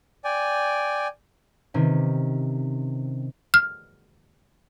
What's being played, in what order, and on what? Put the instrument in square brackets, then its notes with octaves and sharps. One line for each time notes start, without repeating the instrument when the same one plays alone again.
[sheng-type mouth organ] D5 G5 G#5
[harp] C3 D#3 C#4
[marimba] F6